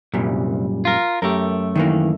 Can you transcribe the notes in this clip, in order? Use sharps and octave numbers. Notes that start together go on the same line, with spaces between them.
C2 F#2 A#2 G3
F4 A#4
F#2 A3 G4 A#4
D#3 E3 A#3